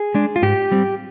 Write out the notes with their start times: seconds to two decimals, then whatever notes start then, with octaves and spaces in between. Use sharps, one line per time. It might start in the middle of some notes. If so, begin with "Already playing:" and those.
Already playing: G#4
0.14 G#3 D4
0.36 F4
0.42 G#2 G4
0.72 G3 C4